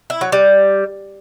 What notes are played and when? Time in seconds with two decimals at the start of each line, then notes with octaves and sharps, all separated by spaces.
0.10 E4
0.21 F#3
0.32 G3